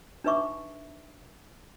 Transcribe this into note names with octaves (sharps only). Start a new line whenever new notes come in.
D4 D#4 B4 E5 C#6 D6